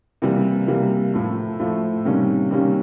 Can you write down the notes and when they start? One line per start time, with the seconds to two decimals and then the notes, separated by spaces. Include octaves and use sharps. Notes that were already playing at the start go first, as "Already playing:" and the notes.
0.22 C3 E3 G3 A#3
0.68 C3 E3 G3 A#3
1.14 A2 F3 A3
1.60 A2 F3 A3
2.05 C3 D#3 G3 A#3 C#4
2.51 C3 D#3 G3 A#3 C#4